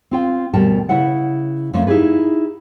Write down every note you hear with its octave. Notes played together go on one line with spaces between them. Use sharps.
C4 F4 G5
D2 B2 G3 A#4 G5 A5
C#3 E4 B4 E5 F#5
F2 F3 A3 A#3 C#4
D#4 E4 G4 G#4 B4